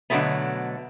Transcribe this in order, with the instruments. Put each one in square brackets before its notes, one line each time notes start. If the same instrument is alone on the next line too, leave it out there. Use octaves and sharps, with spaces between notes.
[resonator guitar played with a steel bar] B2 D3 D#3 F#3 A3 B3